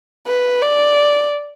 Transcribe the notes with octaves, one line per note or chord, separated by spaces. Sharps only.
B4
D5